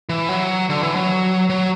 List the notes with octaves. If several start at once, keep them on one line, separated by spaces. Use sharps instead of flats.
E3
F#3
D3
E3
F#3
F#3